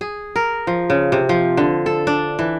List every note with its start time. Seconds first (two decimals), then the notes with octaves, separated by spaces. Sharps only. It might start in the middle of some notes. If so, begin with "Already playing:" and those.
0.01 G#4
0.36 A#4
0.67 F3
0.90 C#3
1.12 C3
1.29 F3
1.57 D3
1.86 A4
2.07 D4
2.39 E3